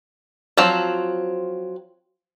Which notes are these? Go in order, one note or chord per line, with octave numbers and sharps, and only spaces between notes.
F3 F#3 C4